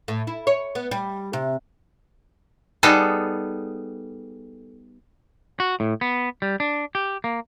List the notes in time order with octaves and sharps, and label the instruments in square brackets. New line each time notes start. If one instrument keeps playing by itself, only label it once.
[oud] A2
E4
C#5
B3
G3
C3
[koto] G3 B3 D#4 G#4 A4
[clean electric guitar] F#4
A2
B3
G3
D4
G4
A#3